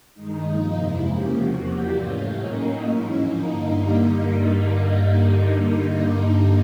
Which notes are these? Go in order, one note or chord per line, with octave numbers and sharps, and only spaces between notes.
G2 D#3 G#3 D#4
C3 F3 A#3
F2 C3 E3 G#3 E4
C#3 F3 A#3 C#4 G4
E2 C3 F3 F#4
C3 E3 G3 A#3 G4
G#2 E3 A3 C#4 F4
A2 F#3 A#3 C#4 D#4
A2 F#3 A#3 C#4
G#2 E3 G#3 C#4 E4
D#2 D3 F3 A#3 D#4
G2 D3 G3 A#3 D#4